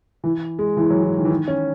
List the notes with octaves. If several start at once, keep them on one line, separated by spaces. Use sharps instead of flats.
E3
G#3
E3
F#3
E3
D#3
E3
D#3
C#4